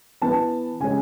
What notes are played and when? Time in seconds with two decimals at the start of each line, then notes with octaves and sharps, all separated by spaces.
0.22 E3 B3 A5
0.80 C#3 G#3 C#4 G#5